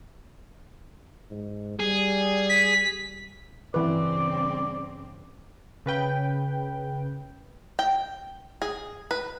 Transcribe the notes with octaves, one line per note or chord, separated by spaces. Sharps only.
G#2
G3 G#4
B6
G2 C#3 E3 C4 B4 D5
C#3 B4 G5
G5
G#4
B4